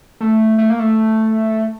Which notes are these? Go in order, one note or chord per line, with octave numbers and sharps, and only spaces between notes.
A3
A3
A#3
A3